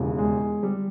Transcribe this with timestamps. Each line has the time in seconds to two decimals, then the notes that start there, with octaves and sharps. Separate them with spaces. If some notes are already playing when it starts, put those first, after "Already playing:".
Already playing: E1 D#2 C#3 E3
0.18 G#3
0.63 G3